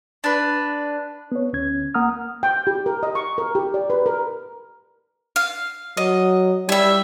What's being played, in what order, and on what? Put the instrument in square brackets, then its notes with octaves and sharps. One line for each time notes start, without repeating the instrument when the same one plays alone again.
[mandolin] D4 B4
[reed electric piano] B3 C#5
D2 C#4 G#6
A#3 F#5 A#5 D#6 F6
[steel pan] G5
G4
A#4
D#5
C#6
A#4
G4
D5
B4
A#4
[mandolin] F5
[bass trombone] F#3 [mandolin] D#5
[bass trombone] G3 [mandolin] E4 E5